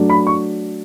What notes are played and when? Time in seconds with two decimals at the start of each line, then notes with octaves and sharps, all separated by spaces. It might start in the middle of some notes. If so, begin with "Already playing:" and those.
Already playing: F#3 A3 D4
0.10 B5
0.27 C#6